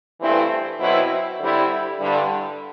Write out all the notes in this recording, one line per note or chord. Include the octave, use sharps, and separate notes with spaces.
G2 E3 A3 C4 E4
B2 F#3 C4 E4
D3 G3 C4 E4
G2 D3 G3